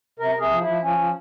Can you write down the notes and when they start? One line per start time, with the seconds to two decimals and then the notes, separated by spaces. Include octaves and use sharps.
0.19 C3 A#4
0.35 C3 G#4
0.50 F3
0.61 E4
0.67 F3
0.82 F3 C#4
0.98 F3